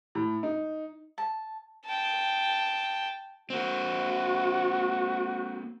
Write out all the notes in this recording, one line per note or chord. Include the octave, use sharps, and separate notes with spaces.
A2
D#4
A5
G5 A5
A#3 C4 F#4